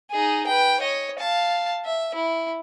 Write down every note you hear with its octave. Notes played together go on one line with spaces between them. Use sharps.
D#4 G#4
B4 G5
C#5 D#5
F5 A5
E5
E4